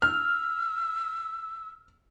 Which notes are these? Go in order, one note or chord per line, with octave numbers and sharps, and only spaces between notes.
E6 F6